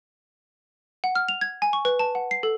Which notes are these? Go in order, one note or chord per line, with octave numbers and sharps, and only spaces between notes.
F#5
F6
F7
G#6
G#5
C#6
B4
A5
F#5
C7
A4